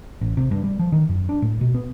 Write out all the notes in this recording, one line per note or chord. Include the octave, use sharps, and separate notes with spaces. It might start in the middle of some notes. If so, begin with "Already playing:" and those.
A1
C3
G2
G3
F3
D#3
F#2
D4
A2
B2
B3